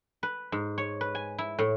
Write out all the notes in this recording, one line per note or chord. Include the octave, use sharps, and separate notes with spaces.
B4
G#2
C#5
B4
G#5
E4
A2